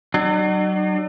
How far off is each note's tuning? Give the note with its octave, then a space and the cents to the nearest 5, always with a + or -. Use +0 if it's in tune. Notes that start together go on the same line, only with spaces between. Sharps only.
F#3 +35 D#4 -45